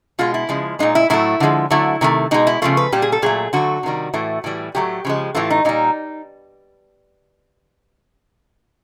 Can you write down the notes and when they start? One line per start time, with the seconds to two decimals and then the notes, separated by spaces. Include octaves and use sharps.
0.19 B2 G#3 F4
0.34 E4
0.49 C#3 F3 G#3
0.79 A#2 F3 G#3 D#4
0.95 E4
1.10 A2 F#3 A3 E4
1.40 D3 F3 G#3
1.70 D3 F#3 A3 E4
2.01 C3 D#3 F#3 A3
2.31 B2 G#3 D#4
2.47 E4
2.62 C#3 F3 A3 F4
2.77 B4
2.92 A#2 G3 G4
3.02 G#4
3.12 A4
3.22 A#2 F#3 A3 G#4
3.53 D3 F#3 A3 F#4
3.83 C3 D#3 G3
4.14 A2 E3 A3
4.44 A2 E3 G3
4.75 A2 F#3 A3 G4
5.05 C#3 F3 G#3
5.35 A2 E3 A3 F4
5.50 D#4
5.65 A#2 G3 D#4